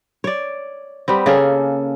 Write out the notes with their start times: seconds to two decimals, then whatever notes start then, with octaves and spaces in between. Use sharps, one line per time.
0.24 C#5 D5
1.08 G3 B3 C4
1.26 C#3 A#3 G#4 A4